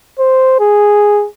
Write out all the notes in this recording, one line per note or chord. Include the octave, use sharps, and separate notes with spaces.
C5
G#4